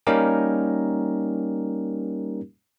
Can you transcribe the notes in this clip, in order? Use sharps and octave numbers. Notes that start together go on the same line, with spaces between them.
G3 A#3 C#4 D#4 G4 A#4